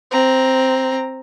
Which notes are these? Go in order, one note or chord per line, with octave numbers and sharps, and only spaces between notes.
C4 A#5